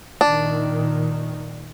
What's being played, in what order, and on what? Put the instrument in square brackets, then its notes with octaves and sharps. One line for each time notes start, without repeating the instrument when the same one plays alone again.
[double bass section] A#2 D#3 [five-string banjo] D4